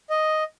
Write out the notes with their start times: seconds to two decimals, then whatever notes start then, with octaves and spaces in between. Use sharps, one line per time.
0.10 D#5